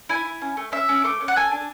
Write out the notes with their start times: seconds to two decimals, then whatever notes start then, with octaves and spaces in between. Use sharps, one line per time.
0.09 E4 G#5
0.25 E4
0.41 C#4
0.57 A3
0.72 C#4 E5
0.89 C#4
1.04 A3 D6
1.21 C#4
1.28 F#5
1.36 A4 G#5
1.51 D4